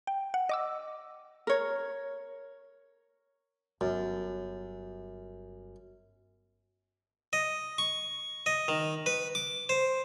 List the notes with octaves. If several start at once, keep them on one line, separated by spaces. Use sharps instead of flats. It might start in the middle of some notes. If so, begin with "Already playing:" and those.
G5
F#5
D#5 D6 E6
A#4 C#5
G1 F#2
D#5
C#6
D#5
D#3
B4
D6
C5